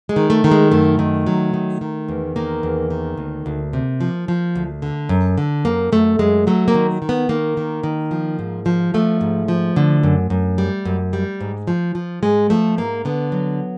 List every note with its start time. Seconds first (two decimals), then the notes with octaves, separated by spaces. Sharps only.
0.09 G#3
0.16 D#3
0.30 A3
0.44 D#3
0.51 G#3
0.71 F#2 A3
0.99 D#3
1.26 F#3
1.54 D#3
1.81 D#3
2.09 E2
2.36 D#3 A#3
2.63 E2
2.90 D#3
3.18 D2
3.46 D2
3.73 C3
4.01 F3
4.28 F3
4.56 D2
4.82 D3
5.09 F#2
5.38 D3
5.65 F#2 A#3
5.92 F#2 A3
6.19 F#2 G#3
6.47 F#3 A3
6.68 A#3
6.74 D#3
7.02 D#3
7.09 B3
7.29 D#3 A#3
7.57 D#3
7.83 D#3
8.11 F3
8.39 G#2
8.66 F3
8.94 F3 A3
9.21 G#2
9.48 F3
9.76 D3
10.03 F#2
10.30 F#2
10.58 G3
10.85 F#2
11.13 G3
11.41 G#2
11.68 F3
11.95 F3
12.23 G#2 G#3
12.50 F3 A3
12.77 G#2 A#3
13.05 D3 B3
13.32 F#3